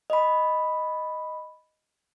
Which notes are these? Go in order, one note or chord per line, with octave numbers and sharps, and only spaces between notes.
D#5 B5